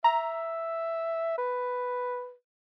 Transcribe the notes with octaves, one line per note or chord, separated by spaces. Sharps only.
E5 A#5
B4